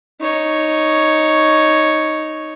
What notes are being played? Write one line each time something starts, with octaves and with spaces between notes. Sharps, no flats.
D#4 C#5